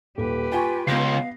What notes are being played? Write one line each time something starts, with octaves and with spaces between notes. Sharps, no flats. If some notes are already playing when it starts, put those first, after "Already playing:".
D#1 G4 B4
F4 G5 G#5 C#6
C#2 B3 F5 A#6 C7